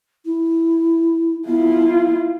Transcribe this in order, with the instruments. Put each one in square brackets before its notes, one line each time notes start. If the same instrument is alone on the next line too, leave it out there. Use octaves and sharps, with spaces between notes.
[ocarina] E4
[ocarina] B3 [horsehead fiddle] E4 F4